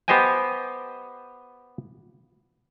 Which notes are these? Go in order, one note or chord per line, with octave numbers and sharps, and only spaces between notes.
B3 G4 C5 D#5 G5 G#5